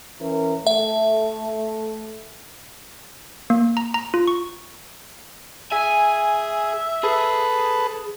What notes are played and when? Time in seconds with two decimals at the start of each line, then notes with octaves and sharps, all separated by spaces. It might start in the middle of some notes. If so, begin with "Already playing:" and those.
0.21 E3 C#4 A#4
0.67 A3 A4 E5
3.50 A#3
3.77 A#5
3.94 A#5
4.14 F4
4.28 C#6
5.72 G#4 E5 G#5
7.03 G#4 A4 B4